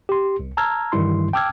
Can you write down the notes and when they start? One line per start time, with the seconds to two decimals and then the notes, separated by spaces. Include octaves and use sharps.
0.09 G4 C6
0.39 C2
0.57 A5 A#5 E6 F6 G#6
0.92 G2 D#3 E3 G3 E4 C6
1.33 G5 A5 D6 E6 F6 G#6